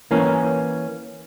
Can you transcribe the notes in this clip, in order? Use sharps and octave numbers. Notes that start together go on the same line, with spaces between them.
E3 A#3 C#4